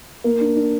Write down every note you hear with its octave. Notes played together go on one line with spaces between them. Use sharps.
A#3
D4
D4